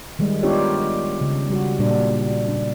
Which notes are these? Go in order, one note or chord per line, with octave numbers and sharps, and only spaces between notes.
D#3 G3 G#3
B3 D4 D#4 F4 G4 C#5
C#3
G3 F#4
A#2 G3 D4
D4